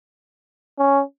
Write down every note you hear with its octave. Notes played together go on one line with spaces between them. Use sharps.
C#4